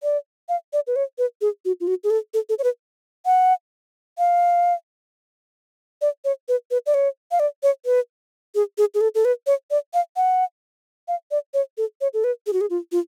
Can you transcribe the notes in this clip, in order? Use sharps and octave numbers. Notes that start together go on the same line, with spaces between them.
D5
F5
D5
B4
C#5
B4
G#4
F#4
F4
F#4
G#4
A4
A4
A4
C#5
B4
F#5
F5
D5
C#5
B4
B4
D5
C#5
F5
D5
C#5
B4
G#4
G#4
G#4
A4
A4
B4
C#5
D5
F5
F#5
F5
D5
C#5
A4
C#5
A4
B4
G#4
F#4
G#4
F4
F4